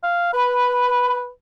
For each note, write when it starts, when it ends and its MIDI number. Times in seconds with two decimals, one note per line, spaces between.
0.03 0.33 77
0.33 1.29 71
0.33 1.14 83